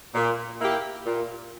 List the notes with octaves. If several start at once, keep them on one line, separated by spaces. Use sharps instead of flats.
A#2
A#3 E4 G4
A#2